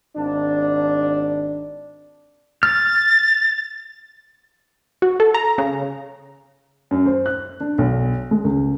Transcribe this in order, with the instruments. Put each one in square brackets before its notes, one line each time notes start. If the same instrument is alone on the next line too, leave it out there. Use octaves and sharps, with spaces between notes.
[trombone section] G#1 D4
[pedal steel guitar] F6 [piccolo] A6
[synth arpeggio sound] F#4
A4
A#5
C#3
[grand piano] F#2
C5
F#6
D4
B1
G#3
C#2